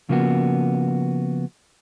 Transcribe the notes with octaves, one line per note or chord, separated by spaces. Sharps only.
C#3 F3 A#3 B3 F#4